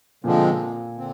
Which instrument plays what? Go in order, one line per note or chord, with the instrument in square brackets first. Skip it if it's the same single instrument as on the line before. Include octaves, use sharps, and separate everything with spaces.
[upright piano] A#2 [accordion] D3 F3 G#3 C4
[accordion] D3 C4